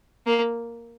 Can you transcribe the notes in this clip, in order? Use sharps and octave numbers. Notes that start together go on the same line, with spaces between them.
A#3